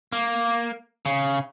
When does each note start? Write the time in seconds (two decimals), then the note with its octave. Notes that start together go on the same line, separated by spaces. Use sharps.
0.12 A#3
1.06 C#3